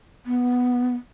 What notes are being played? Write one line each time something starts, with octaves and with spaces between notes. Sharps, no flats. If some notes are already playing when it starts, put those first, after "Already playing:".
B3